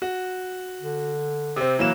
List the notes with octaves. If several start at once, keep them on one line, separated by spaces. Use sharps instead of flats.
F#4
D3
C3 C4
E3 F#3 A#3 E7